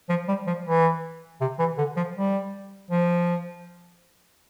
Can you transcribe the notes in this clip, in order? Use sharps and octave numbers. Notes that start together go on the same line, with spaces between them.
F3
G3
F3
E3
C3
E3
D3
F3
G3
F3